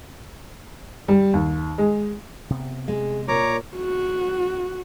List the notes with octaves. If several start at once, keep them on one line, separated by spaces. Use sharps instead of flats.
G3
D#2
G#3
C3 B3
G#3 G#4
A#2 A#4 C#5 A#5 D6
F#4